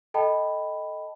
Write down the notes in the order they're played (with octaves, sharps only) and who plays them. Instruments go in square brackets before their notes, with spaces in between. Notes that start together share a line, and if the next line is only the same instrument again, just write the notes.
[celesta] A4 D#5 G5 A5 B5